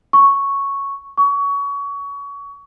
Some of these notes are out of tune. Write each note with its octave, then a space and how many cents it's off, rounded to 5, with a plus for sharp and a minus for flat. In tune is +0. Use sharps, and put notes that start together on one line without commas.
C#6 +0
C#6 +25